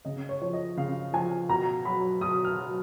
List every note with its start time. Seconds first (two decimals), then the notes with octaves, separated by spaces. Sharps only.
0.05 C#3 D#5
0.29 C#5
0.41 F3 C#5
0.53 D#5
0.77 C#3 F5
1.13 F3 G#5
1.49 B2 A#5
1.85 F#3 B5
2.21 B2 D#6
2.45 F6
2.57 F#3